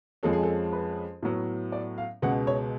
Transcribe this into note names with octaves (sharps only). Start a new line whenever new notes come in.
F2 F3 G#3 C#4 A4
G#4
A4
B4
A2 F#3 B3
D5
F5
C#2 B2 G#3 F#5
C#5